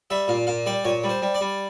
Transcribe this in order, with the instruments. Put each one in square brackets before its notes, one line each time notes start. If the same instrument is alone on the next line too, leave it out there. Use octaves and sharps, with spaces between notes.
[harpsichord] G3 E5
A#2 F5
A#2 F5
G3 D5
A#2 C#5
G3
C5
G3
D5
G3